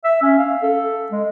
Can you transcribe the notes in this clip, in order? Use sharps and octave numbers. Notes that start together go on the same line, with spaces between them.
E5
C#4
F5
A4
G#3